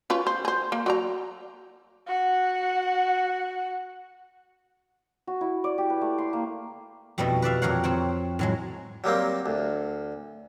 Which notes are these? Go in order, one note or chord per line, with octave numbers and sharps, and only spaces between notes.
C#4 F4 B4
C5
G#4 C5
A#3
F#3 D5 A#5
F#4 F#5
F#4
E4
D5
G4
B4
A3
C6
A#3
F2 B2 G3 A3 E4 D#5
B4 D5 E5 F5
F2 A#2 A#4 C#5 F5 F#5
C4 C#5 G5
A2 F#3 G#3
F#3 G3 A#3 C4
D2